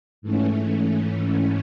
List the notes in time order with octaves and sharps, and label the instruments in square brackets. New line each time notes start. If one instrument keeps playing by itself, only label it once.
[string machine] G#2 E3 A3 C#4